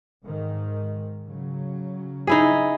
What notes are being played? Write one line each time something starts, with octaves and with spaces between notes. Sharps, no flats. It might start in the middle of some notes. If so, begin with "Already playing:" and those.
G#2 D#3
C#3 F#3
D#4 E4 G#4